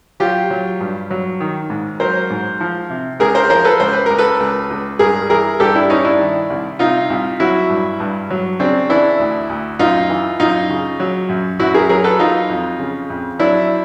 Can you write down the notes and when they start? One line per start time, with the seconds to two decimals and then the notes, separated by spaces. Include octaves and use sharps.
0.20 F#3 F4 G4
0.50 F#3
0.80 G2
1.10 F#3
1.40 D#3
1.70 G#2
2.00 F#3 A#4 C5
2.30 G#2
2.60 F3
2.90 C3
3.20 C#2 G#4 A#4
3.35 A#4 C5
3.50 F3 A#4 C5
3.65 A4 B4
3.80 C#2 C5
3.93 B4
4.06 C#2 A#4
4.18 A4 B4
4.40 C#2
4.70 C#2
4.99 G2 G#4 A#4
5.30 E3 G#4 A#4
5.60 G2 G4 A4
5.75 D4 E4
5.90 G2 C#4 D#4
6.05 D4 E4
6.20 D#3
6.50 C2
6.79 C3 D#4 F4
7.10 C2
7.40 F#3 E4 F#4
7.70 G2
8.00 G2
8.30 F#3
8.59 C#3 C4 D4
8.89 E3 D4 E4
9.19 D2
9.49 D2
9.79 F#2 D#4 F4
10.09 E3
10.39 F#2 D#4 F4
10.70 C#3
11.00 F#3
11.29 F#2
11.59 F#2 E4 F#4
11.74 G#4 A#4
11.89 F#3 G#4 A#4
12.04 A4 B4
12.19 F#3 D#4 F4
12.49 F2
12.79 C#3
13.10 F2
13.39 F#3 D4 E4